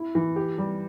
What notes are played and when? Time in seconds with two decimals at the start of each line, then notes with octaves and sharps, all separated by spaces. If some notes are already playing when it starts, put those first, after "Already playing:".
Already playing: E4
0.15 E3
0.36 G4
0.58 G3